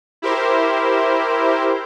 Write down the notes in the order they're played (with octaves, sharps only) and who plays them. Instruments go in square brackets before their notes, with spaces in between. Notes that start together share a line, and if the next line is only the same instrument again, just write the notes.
[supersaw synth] E4 G4 A#4 C5